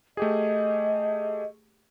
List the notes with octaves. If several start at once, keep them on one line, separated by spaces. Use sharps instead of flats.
A3 G4 G#4 D#5